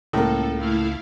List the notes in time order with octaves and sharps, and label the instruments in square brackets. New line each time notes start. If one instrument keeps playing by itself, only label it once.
[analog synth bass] C#2 [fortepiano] A2 A#3 [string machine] A4
[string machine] A3 E4 F5